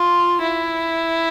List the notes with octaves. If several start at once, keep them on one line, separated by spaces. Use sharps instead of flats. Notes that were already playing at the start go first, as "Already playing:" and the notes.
Already playing: F4
E4